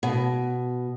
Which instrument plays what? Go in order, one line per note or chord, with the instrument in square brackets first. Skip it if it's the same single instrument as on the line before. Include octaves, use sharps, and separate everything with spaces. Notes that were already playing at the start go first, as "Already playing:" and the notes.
[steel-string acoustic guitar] B2